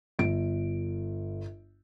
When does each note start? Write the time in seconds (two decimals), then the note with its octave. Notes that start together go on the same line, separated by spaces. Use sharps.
0.19 G1 D7